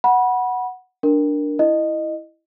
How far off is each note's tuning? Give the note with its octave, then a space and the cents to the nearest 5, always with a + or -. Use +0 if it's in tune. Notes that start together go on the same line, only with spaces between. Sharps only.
F#5 +0 B5 -25
D4 +0 A#4 +0
E4 +0 D#5 -15